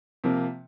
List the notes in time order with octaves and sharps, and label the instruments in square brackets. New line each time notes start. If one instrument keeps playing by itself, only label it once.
[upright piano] C3 F3 A#3